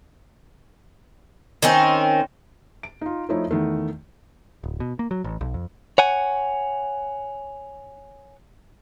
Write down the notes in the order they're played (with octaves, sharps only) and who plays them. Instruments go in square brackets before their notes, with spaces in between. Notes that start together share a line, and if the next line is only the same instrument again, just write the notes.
[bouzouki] D#3 C4 C#4
[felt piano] D7
D#4 F4
F3 A3 D#4 E4 C#5 D#5
E2 D#3 A3
[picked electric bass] D1
B2
A#3
F#3
A1
B1
F2
[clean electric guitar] C#5 F#5 G#5